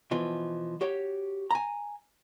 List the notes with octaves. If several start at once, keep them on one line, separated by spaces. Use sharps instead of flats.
B2 E3 F3
F#4 G4 C#5
G#5 A#5